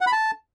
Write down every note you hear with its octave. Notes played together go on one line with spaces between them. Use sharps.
F#5
B5
A5